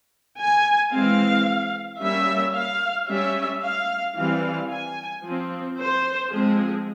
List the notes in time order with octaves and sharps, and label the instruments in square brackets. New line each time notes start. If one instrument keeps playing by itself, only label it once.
[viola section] G#5
E3 G#3 C4 F5
G3 A#3 C#4 E5
F5
G3 C#4 E5
F5
E3 G3 C4 F5
G#5
F3 C4
C5
F3 G#3 C4 G#4